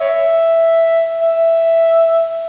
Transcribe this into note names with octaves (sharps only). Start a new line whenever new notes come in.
C#5 E5
E5